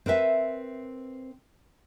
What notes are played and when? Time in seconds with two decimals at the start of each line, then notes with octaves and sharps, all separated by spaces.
0.06 C4 A#4 B4 E5